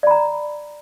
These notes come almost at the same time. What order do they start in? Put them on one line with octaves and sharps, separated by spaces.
D5 B5 A#5